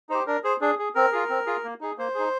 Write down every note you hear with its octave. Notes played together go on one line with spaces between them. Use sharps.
D#4 G4 C5
D4 A#4
G#4 C5
D4 G#4
G#4
C4 A#4
F4 G#4
C4
F4 G#4
A#3
D#4 G#4
A#3 C5
D#4 G#4